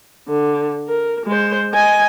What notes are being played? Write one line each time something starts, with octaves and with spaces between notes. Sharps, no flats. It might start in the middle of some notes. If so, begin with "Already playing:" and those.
D3
A#4
G#3 C5
D#5 G#5